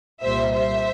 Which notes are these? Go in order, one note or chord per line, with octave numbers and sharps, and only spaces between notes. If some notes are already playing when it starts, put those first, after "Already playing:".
C2 A#2 G3 C5 E5
C5 E5